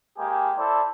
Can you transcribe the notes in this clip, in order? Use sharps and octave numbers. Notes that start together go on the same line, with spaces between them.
G#3 A#3 G4 G#4
E4 A4 C5 D5